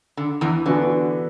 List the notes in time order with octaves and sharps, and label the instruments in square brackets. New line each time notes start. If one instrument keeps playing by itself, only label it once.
[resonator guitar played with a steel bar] D3
E2 E3
[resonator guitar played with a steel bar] D3 [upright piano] E3 B3 D4 F#4